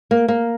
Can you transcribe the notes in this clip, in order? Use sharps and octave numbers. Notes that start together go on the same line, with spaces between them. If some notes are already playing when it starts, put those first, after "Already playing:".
A#3
A#3